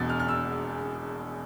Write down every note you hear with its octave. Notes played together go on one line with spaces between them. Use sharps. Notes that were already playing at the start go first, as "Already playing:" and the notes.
Already playing: E1 E2 B2 A6
F6
F6
E6